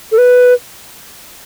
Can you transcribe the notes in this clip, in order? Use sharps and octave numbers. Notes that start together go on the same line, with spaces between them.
A4
B4